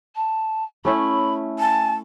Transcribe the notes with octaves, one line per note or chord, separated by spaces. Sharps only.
A5
A3 C#4 E4 B5
G#5 A5